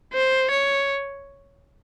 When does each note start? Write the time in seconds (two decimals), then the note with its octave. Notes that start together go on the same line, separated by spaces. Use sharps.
0.14 C5
0.51 C#5